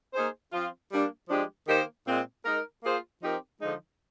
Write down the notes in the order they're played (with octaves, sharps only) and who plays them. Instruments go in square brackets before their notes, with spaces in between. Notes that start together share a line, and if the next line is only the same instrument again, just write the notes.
[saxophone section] A#3 D#4 G#4 C5
F3 C4 F4
G3 A#3 D4
F3 G#3 D4 G4
D#3 A#3 D#4 G4 C5
A#2 G#3 C4
G#3 D#4 A#4
A#3 F4 G#4 C5
F3 C4 D#4 G4 A#4
D3 F3 G#3 D#4